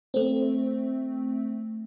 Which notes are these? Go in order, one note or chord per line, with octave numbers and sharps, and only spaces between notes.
A3 C4